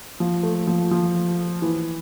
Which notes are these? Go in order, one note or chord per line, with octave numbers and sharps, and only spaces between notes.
F3
A3
F3
F3
E3